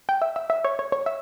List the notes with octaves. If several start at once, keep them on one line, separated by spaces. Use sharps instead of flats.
G5
E5
E5
E5
C#5
C#5
C#5
E5